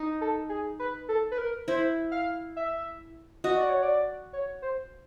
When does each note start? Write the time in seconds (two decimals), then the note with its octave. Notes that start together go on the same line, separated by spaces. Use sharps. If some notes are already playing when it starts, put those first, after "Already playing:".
Already playing: D#4
0.21 A4
0.49 G#4
0.79 B4
1.09 A4
1.31 B4
1.38 A#4
1.68 E4 C5
2.11 F5
2.56 E5
3.44 F#4 D#5
3.57 D5
3.69 C#5
3.83 D5
4.33 C#5
4.62 C5